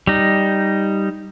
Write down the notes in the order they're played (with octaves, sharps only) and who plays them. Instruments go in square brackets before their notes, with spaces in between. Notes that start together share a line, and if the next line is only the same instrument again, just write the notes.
[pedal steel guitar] G3 D#4